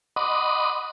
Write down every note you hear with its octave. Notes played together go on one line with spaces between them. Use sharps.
D#5 F#5 B5 C6 D6 D#6